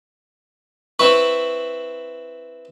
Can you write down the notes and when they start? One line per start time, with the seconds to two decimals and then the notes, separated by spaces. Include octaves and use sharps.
0.99 C4 E4 B4 C#6